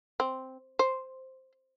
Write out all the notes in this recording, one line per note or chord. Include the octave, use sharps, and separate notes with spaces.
C4
C5